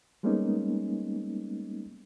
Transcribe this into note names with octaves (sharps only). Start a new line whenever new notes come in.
G3 G#3 A#3 B3 C#4 D#4